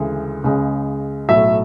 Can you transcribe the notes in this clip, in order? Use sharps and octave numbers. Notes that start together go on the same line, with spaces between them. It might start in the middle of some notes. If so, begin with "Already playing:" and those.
Already playing: D2 C#3 E3 G#3
C#2 C#3 G#3
B1 A2 F#3 E5